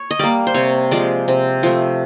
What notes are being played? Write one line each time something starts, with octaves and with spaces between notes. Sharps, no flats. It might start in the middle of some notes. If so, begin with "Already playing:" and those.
Already playing: C#5
D#5
G3 A#3 D5
C5
C3 C#5
F3 G#3 D5
C3
F3 A3